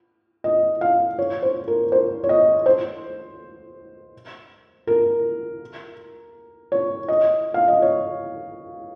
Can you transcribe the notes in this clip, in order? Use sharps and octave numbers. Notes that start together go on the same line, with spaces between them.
D#5
F5
C#5
C5
A#4
C5
C#5
D#5
C5
A#4
C#5
D#5
F5
D#5
C#5